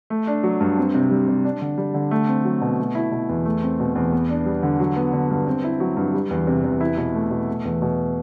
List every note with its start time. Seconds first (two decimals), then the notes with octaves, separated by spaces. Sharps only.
0.10 A3
0.27 D4
0.43 F#3
0.61 G2
0.78 C4
0.94 C3
1.11 G3
1.27 C3
1.44 D4
1.61 D3
1.78 G3
1.94 D3
2.11 A3
2.28 C4
2.45 F#3
2.61 B2
2.78 A3
2.95 E4
3.12 B2
3.29 E2
3.45 A3
3.63 C4
3.80 B2
3.95 E2
4.12 B3
4.29 D4
4.46 G3
4.63 D3
4.80 F#3
4.96 B3
5.13 D3
5.30 G2
5.47 C4
5.64 E4
5.80 F#3
5.97 G2
6.14 G3
6.31 E2
6.47 C3
6.64 E2
6.81 E4
6.97 B2
7.14 A3
7.31 B2
7.48 A3
7.65 E2
7.82 B2